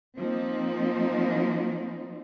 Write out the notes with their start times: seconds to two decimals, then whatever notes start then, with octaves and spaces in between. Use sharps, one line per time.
0.18 F3 A#3 C4 D#4